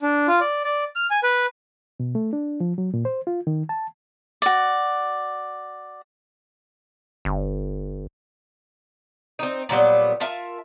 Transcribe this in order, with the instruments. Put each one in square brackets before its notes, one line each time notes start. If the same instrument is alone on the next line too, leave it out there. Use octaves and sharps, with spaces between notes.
[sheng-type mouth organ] D4
F4
D5
D5
F6
G#5
B4
[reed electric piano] B2
A3
D4
F3
F#3
A#2
C5
F4
D#3
A5
[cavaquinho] F#4 D5
[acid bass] G1
[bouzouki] C4 D#4
A#2 F#3 G3 B3
F4 A#4 E5 A5